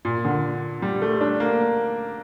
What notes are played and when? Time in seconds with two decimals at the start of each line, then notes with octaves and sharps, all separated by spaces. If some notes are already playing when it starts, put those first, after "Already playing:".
0.05 A#2
0.25 D3
0.82 G3
1.02 A3
1.21 D4
1.40 A#3